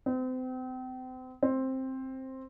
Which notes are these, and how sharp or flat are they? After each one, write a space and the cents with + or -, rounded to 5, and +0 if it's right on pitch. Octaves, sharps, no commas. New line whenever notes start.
C4 -35
C4 +10